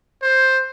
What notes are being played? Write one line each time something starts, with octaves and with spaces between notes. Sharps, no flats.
C5